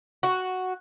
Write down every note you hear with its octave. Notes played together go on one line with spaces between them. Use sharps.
F#4